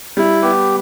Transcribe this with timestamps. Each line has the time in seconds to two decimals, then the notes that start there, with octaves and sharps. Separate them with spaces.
0.17 G3 E4
0.42 B3 G4